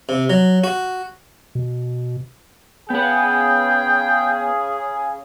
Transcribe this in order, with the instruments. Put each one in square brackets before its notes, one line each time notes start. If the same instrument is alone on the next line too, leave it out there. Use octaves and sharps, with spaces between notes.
[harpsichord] C3
F#3
F#4
[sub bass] B2
[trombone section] C#3 G#4 [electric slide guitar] B3 B4 [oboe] G5